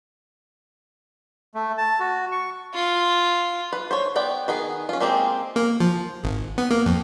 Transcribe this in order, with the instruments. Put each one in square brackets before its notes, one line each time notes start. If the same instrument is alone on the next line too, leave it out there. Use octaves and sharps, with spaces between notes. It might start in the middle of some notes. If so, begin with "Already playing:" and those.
[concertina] A3
A5
F#4
C#6
[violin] F4
[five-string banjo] B4
C5 C#5
B3 D5 G5
D#3 B3 G#4
C#4 F4
G#3 A#3 C4 G4 G#4
[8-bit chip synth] A#3
F3
G#1
B3
A#3
F2